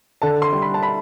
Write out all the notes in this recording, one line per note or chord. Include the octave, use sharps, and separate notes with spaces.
D3 A5
C6
G3
B5
A5
B5